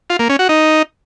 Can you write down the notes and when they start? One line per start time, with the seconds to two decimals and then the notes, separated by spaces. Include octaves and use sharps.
0.10 F4
0.19 A#3
0.29 C#4
0.39 F#4
0.49 D#4